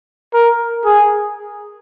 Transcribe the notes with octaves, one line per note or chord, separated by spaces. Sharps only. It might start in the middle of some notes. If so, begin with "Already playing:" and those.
A#4
G#4